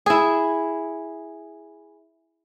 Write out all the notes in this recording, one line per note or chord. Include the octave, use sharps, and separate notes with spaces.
E4 G#4